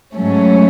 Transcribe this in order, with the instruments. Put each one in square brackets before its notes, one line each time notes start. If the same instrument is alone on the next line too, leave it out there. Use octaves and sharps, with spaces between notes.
[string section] G#2 F#3 A3 C#4